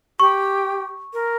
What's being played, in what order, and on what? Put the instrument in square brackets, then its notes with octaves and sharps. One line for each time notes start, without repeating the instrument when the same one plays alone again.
[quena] G4 [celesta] C#6
[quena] A#4